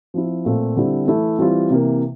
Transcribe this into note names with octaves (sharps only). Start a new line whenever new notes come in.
F3 C4 E4
A#2 A3 C4 F4
D3 G3 C4 E4
E3 A3 E4
E3 G3 C4 F4
C3 E3 A#3